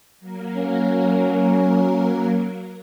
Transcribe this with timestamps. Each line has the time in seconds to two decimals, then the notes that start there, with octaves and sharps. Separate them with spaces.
0.20 F#3 A#3 A#4
0.56 C#4